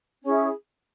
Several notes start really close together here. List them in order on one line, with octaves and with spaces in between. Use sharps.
C#4 G#4 E4